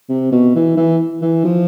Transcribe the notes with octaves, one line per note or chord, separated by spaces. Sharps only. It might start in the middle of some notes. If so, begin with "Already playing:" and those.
C3
B2
E3
E3
E3
F3